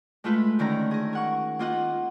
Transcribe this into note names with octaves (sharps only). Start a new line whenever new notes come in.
G#3 A3 F4 B4
D3 D#3 C#4 A#5
G#4 D#5
A#4 F#5 C#6
A#3 F4 D#5 F#5